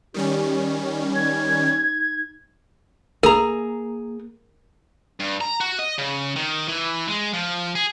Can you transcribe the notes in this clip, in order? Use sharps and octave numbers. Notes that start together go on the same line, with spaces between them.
D#3 G3 C#4 G4
D#4 G#6
A#3 G#4 A#4 A#5
G2
A#5
F#4
D#5
C#3
D#3
E3
G#3
F3
G#4